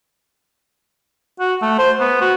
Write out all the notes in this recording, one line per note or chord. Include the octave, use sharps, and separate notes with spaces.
F#4
A3
C5
B3
F#4